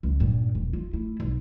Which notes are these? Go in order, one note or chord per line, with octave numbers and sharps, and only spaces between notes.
C#2
G2 A#2
E1
F4
A3 E4
B1